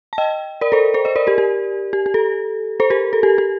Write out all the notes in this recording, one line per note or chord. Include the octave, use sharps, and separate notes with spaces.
A5
D#5 G5
A#4 D5
A4 C5
A4 C5
C5 D#5
A#4 D5
G4 A#4
G4
G4
G4
A4
A4 C5
G4 A#4
A4
G4
G4